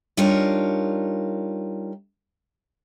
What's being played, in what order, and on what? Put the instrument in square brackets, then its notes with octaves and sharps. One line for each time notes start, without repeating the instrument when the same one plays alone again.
[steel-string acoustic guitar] G3 D4 D#4 F4 A#4 C#5